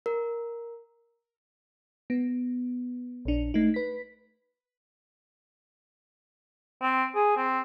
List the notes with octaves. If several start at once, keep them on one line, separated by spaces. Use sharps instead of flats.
A#4
B3
A#1 D4
A3 D#4
B4 B6
C4
G#4
C4